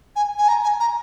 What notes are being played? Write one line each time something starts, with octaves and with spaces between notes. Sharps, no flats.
G#5
G#5
A#5
G#5
A#5